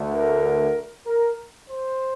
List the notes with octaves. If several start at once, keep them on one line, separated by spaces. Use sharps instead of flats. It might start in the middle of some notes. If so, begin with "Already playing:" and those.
Already playing: D2 D3 A3
A#4
A#4
C5